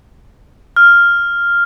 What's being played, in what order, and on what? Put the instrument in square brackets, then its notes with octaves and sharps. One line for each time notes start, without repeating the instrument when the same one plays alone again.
[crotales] F6